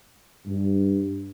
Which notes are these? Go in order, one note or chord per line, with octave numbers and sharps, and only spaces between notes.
G2